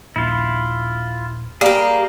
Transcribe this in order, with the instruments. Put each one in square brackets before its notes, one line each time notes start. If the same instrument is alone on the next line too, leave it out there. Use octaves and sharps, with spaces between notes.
[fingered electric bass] D#1 A#1 [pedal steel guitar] E4 F4
[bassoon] G3 [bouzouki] A#3 G4 [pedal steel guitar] G#4 A#4